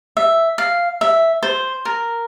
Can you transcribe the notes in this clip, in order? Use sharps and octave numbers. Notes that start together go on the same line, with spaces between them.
E5
F5
E5
C5
A#4